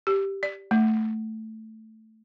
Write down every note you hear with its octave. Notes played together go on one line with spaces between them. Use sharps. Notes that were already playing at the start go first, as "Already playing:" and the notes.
G4
D5
A3